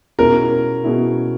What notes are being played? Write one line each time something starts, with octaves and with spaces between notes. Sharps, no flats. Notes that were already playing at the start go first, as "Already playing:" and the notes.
B2 G#3 C#4 E4 A#4
B2 G#3 C#4 E4